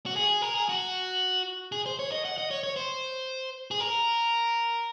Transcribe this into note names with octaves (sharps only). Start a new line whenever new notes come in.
F#4
G#4
A#4
G#4
F#4
G#4
C5
C#5
D#5
F#5
D#5
C#5
C#5
C5
G#4
A#4